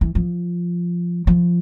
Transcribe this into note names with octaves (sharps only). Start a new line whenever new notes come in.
E3
F3
F3